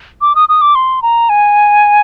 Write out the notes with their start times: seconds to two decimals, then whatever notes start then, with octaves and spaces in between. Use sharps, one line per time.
0.21 D6
0.35 D#6
0.49 D#6
0.61 D6
0.75 C6
1.02 A#5
1.29 G#5